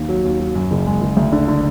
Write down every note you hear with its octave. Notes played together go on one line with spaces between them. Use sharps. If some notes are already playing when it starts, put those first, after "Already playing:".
Already playing: D#2
F#3
D#2
F#3
F#2
F#1
G#3
F#1
D2
D3
D3